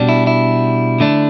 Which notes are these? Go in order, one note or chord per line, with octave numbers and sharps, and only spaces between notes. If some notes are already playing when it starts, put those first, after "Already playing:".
Already playing: B2 G3 D4
E4
E4
D3 A3 D4